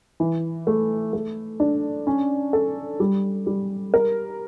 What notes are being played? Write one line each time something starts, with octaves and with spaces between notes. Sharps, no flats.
E3
A3
A3
D4
C#4
A4
G3
G3
A#4